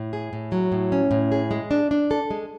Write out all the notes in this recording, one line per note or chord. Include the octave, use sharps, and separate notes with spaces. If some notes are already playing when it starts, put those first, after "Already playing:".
Already playing: A2
G#4
A2
F#3
A2
C#4
A2
G#4
G#3
D4
D4
A4
G#3